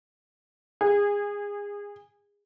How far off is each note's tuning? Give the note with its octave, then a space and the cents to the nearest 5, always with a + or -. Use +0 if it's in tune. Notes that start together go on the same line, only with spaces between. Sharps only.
G#4 -25